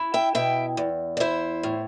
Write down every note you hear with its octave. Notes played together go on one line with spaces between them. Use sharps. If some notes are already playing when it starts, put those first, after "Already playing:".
Already playing: E4
E5 G5
B2 E5 G5
E2
D5
E4 C5 E5
A2